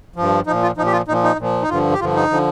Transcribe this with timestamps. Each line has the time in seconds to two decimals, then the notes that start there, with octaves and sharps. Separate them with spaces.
0.16 G2 F3
0.47 F3 D#4
0.51 A#2
0.62 F4
0.77 F3 D#4
0.81 A#2
0.87 G4
0.93 F4
1.08 A#2 D#4
1.11 F3
1.23 D#4
1.39 A#2 F3
1.62 D#4
1.69 G2 D3 F3 F4
1.94 G4
2.00 G2 D3 F3 F4
2.15 D#4
2.31 D3 F3